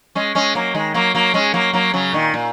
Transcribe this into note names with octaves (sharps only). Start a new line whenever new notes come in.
G#3 C#4
G#3 C#4
F#3 A#3
D#3 G#3
F#3 A#3
F#3 A#3
G#3 C#4
F#3 A#3
F#3 A#3
C#3 F#3
A#2 D#3
A#2